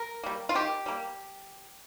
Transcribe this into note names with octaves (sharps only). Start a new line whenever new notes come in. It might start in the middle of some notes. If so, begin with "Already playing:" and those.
Already playing: A#4
G3 A#3
F4
D#3 G4
G3 A#3